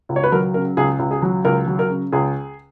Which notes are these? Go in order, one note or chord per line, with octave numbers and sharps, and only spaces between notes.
C#2
C#5
B4
F#3 A#4
C#3 A#4
C#2 G#4
C#2
G#4
F#3
C#2 A#4
F#3
A#4
C#3
C#2 G#4